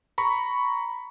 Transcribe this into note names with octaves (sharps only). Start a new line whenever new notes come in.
A#5 B5 C#6